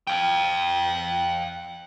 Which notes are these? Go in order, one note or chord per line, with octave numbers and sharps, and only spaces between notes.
F5 G5